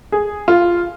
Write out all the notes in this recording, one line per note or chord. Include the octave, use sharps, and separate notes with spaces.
G#4
F4